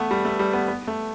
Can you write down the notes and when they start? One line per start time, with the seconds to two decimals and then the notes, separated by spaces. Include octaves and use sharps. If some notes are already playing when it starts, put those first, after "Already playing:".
Already playing: A3 B3
0.11 G3
0.25 A3
0.39 G3
0.53 B3
0.68 B3
0.87 A3